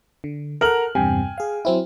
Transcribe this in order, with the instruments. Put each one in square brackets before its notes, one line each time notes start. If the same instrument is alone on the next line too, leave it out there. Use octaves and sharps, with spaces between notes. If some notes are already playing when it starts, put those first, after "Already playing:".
[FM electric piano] D3
[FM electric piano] A4 F#5 [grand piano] A#4 F6 F#7
[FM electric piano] E2 G2 C3 [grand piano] G5 G#5
[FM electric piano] G#4 F5
F#3 C4 E4